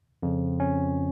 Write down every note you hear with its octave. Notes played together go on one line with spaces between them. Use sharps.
F2 C#3
C#4